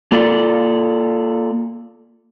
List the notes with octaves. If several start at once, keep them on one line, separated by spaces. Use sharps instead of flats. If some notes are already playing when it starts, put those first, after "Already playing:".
A#3 F4 A4 D5